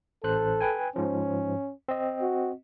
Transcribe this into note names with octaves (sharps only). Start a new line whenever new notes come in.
A1 A4 C5 F#6
B4 G5 G#5
G#2 F3 C#4
C4 D#5
F#4